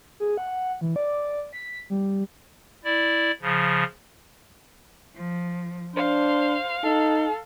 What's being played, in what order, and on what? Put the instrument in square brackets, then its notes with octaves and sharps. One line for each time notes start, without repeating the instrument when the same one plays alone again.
[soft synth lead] G#4
F#5
E3
D5
B6
G3
[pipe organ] E4 D5
C#3 F3
[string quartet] F3
[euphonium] D4 [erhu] C5 [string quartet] F5
[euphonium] D#4 [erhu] A4